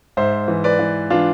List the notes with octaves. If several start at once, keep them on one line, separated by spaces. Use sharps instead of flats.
G#2 C5 E5
E3
B4 D5
E3
E3 D4 F4